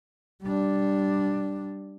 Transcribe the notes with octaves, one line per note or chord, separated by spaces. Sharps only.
G3 D4